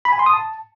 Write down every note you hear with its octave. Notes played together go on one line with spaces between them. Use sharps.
B5
G#5
C6
D#6
A5